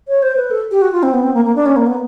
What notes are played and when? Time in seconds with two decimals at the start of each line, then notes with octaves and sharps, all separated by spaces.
0.08 C#5
0.22 C5
0.37 B4
0.51 A4
0.71 G4
0.82 F#4
0.92 F4
1.03 C4
1.13 B3
1.23 C4
1.34 A#3
1.45 A#3
1.55 D4
1.66 C#4
1.76 A#3
1.87 B3